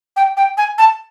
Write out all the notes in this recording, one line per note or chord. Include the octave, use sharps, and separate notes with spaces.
G5
G5
G#5
A5